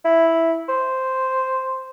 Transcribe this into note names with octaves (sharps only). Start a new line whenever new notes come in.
E4
C5